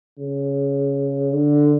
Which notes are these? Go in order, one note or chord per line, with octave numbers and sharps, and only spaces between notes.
C#3
D3